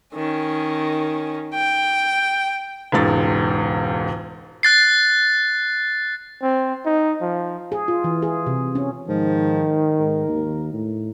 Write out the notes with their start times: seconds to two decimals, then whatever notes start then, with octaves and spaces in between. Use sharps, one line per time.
0.15 D#3 C#4
1.54 G5
2.92 E1 C#2 G#2 A6
4.63 F#6 A6 C7
6.42 C4
6.86 D#4
7.21 F3
7.72 G#4
7.88 F4
8.04 E3
8.22 G#4
8.47 C3
8.75 C#4
9.08 G#2 D#3 F3
9.99 G#2 A#4
10.28 D#2
10.73 A2